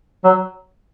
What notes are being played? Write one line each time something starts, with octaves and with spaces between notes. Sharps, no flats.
F#3